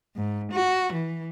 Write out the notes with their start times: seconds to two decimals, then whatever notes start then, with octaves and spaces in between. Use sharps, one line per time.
0.16 G#2
0.52 F#4
0.93 E3